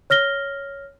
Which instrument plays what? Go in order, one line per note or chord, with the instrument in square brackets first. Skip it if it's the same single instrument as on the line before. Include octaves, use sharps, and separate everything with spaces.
[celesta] C#5 F6 A#6 G7